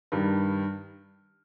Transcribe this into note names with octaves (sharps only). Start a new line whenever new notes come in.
G2 D#3 G3